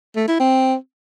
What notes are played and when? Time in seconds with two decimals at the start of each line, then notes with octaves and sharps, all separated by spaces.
0.16 A3
0.28 E4
0.40 C4